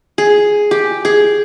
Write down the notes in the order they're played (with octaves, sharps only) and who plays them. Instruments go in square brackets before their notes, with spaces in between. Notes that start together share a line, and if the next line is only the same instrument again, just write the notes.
[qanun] G#4
G4
G#4